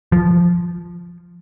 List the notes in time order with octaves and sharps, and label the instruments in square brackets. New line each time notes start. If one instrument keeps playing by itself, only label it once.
[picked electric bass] F3